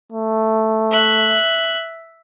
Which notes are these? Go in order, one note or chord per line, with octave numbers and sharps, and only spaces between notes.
A3
E5 F#6